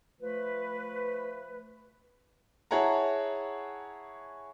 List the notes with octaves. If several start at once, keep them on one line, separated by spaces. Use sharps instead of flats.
F3 A3 B4
E4 G#4 C#5 F#5 A5 A#5